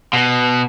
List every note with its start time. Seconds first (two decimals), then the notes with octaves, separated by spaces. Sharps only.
0.13 B2